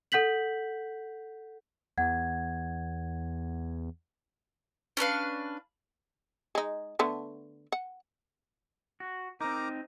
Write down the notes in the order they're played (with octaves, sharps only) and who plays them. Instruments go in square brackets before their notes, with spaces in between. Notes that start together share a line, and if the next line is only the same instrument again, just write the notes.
[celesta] A4 F#5 G6 B6 F#7
[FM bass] E2 [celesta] F#5 G#6
[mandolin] C#4 D4 B4 F5
[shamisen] G#3 D#4
D3 A3 B3
F#5
[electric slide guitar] F#4
[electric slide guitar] C4 D#4 [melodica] A#4 A#5 D6